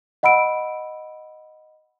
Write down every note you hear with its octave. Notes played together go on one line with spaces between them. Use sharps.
D#5 F#5 B5 E6 D7